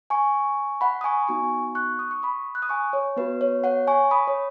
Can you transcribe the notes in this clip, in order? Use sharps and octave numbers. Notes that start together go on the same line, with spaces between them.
G#5 C#6
F#5 B5
D#6
G#5 C#6
B3 D#4 F#4 G#5 C#6
C#6 F#6
D#6
C#6
B5 D#6
F#6
D#6
G#5 C#6
C#5
B3 F#4 B4
C#5
C#5 F#5
G#5 C#6
B5 D#6
C#5